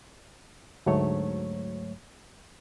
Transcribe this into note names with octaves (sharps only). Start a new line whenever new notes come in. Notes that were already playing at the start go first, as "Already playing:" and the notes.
D2 G#2 F#3 A3 C#5